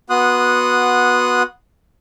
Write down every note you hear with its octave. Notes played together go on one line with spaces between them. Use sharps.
B3 F#4 C6 D#6 F#6